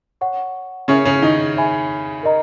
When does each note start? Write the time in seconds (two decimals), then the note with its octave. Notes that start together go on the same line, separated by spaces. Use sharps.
0.21 C#5 F#5 C#6
0.88 C#3 C#4 A#4 E5 G#5 C#6
1.05 C#3 C#4
1.22 D#3 D#4
1.56 C#5 E5 G#5 B5
2.23 A#4 D#5 A#5